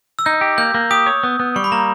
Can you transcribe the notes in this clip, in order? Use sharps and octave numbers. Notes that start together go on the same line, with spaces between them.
E6
D#4 G6
G4
A#3 G6
A#3
G4 D#6
C#5
B3
B3
G3 C#6
B5
A#3 A#5